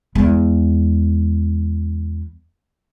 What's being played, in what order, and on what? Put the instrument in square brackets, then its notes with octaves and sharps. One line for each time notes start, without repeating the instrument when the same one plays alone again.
[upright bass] E2 G#3